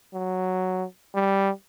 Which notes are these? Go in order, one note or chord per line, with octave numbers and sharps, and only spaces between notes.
F#3
G3